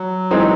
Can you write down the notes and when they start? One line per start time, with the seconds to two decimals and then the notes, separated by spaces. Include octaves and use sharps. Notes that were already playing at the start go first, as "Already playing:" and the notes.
Already playing: F#3
0.31 E3 G#3 C4 D#4